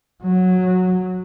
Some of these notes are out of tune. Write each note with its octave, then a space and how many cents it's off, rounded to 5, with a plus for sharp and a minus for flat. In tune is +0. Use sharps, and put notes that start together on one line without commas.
F#3 -10